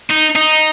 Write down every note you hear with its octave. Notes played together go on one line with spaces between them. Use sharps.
D#4
D#4